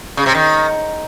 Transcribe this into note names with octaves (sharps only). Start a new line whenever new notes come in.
C#3
C3
D#3